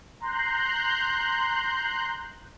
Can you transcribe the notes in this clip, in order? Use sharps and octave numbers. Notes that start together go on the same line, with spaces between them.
A#5 C6 F#6 G6